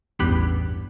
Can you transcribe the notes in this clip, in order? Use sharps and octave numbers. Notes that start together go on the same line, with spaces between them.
A1 E2 G2 G4 B5 F#6